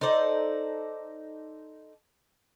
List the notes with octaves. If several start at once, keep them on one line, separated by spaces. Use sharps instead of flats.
D#4 A4 C5 D5